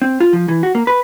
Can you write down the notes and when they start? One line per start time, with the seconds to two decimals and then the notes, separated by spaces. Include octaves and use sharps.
0.02 C4
0.20 F4
0.33 F3
0.49 E3
0.63 F#4
0.75 A#3
0.87 B4